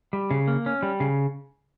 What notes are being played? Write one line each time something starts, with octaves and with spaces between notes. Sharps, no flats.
G3
C#3
A#3
C#4
G3
C#3